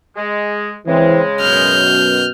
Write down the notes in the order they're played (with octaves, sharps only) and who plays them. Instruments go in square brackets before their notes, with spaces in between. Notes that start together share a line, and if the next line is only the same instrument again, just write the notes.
[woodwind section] G#3
[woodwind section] C#3 G#3 [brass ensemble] E3 C4
[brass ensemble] F#2 B2 [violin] F6 G6